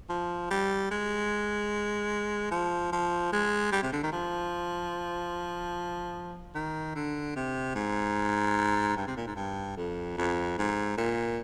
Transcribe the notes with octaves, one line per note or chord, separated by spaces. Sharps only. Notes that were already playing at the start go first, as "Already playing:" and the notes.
F3
G3
G#3
F3
F3
G#3
G3
C3
D3
D#3
F3
D#3
D3
C3
G#2
G2
C3
A#2
G#2
G2
F2
F2
G#2
A#2